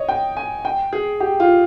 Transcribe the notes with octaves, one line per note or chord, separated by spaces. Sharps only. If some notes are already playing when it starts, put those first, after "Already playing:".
Already playing: C#5 D#5
G5
G#5
G5
G#4
G4
F4